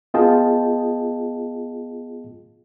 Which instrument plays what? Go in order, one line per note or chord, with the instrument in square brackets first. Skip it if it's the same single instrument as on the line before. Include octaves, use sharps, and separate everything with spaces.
[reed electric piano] B3 F4 G#4 D#5 G5 A5